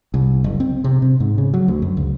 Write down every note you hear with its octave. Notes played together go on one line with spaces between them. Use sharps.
C2
F#1
C4
C3
C3
G#2
C#3
F#3
D2
F#2
C#2